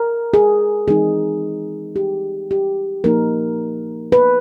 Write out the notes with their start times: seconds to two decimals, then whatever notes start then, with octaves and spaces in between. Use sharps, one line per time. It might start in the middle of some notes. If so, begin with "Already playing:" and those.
Already playing: A#4
0.34 G#4
0.88 E3 G#3 C4 D#4 G#4
1.96 G4
2.51 G4
3.04 F3 A#3 D#4 A#4
4.12 B4